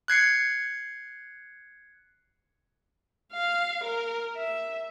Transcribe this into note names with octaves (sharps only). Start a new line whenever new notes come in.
F#6 G#6 C7 C#7
F5
A#4
E5